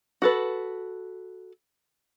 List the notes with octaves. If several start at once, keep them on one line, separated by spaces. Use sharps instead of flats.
F#4 A4 B4